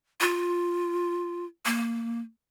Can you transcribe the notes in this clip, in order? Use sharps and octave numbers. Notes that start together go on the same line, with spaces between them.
F4
A#3